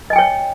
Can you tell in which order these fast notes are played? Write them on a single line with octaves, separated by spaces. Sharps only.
D#5 G#5 G5 C#5